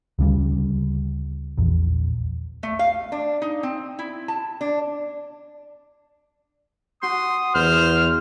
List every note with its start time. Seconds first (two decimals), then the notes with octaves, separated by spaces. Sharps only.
0.19 D2 C#3 G3
1.58 A#1 E2
2.63 A3
2.79 F5
3.12 D4
3.42 D#4
3.63 C4
3.99 E4
4.28 A5
4.61 D4
7.03 F#4 C6 D#6
7.55 E2 C5 F6